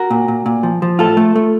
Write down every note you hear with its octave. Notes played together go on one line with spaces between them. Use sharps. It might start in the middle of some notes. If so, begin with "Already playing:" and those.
Already playing: F#4 A#4
A#2
A#2
A#2
F3
F3
A2 F4 A4
A3
A3